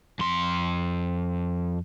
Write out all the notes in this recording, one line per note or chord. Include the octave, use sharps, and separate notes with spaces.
F2 C6